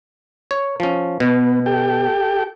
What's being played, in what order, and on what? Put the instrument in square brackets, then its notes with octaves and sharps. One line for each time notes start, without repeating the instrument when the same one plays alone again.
[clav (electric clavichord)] C#5
F3 C#4
[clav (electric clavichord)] B2 [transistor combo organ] B3
[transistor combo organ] G4 A4 G5